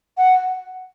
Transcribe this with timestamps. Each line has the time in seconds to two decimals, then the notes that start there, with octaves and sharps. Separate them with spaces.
0.18 F#5